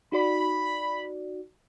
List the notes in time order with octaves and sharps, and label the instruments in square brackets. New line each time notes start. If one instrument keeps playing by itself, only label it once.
[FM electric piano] D#4 F#4 D5 [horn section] B5